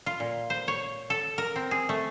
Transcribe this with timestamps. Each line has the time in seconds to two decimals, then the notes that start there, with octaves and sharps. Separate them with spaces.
0.06 F4
0.20 A#2
0.50 C5
0.68 C#5
1.10 A4
1.38 A#4
1.56 C4
1.71 G#4
1.89 A3